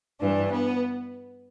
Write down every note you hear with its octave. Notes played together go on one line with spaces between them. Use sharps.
G2 E3 D4
B3